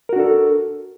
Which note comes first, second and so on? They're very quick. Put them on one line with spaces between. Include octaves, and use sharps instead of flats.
A#4 F#4 D4 A4